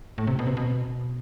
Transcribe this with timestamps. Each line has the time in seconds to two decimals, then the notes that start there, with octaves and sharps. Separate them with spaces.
0.18 A2
0.27 C3
0.39 B2
0.47 C3
0.57 B2